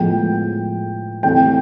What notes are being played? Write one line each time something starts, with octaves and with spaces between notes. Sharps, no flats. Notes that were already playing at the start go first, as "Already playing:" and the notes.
Already playing: A2 F3 G#3 B3 G5
E3 A3 C4 G5